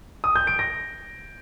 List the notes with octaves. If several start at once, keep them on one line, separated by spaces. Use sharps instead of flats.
D#6
G6
D7
A#6